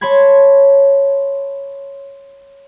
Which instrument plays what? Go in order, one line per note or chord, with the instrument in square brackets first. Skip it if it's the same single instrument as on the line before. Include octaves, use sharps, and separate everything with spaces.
[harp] C#5 A5 B5 C6 G#6